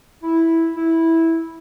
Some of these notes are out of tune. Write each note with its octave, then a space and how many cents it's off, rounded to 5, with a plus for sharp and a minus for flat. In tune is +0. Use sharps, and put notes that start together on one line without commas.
E4 -5
E4 -10